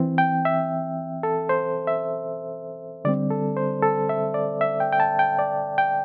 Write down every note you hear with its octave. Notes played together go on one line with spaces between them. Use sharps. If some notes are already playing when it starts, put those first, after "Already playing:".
Already playing: E3 C4
G5
E5
A4
C5
E5
D3 G3 C4 D5
A4
C5
A4
E5
D5
E5
G5
G5
A5
G5
D5
G5